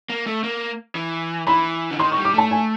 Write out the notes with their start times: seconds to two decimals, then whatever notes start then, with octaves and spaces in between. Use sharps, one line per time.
0.10 A#3
0.27 A3
0.44 A#3
0.95 E3
1.47 E3 B5
1.91 D3
1.99 D#3 C6
2.12 C#6
2.17 G3
2.25 D6
2.34 A3 A5
2.51 G#5